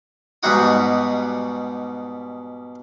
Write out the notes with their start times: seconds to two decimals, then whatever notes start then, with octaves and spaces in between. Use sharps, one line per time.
0.43 G#2 B2 G3 D#4 F#4 D#6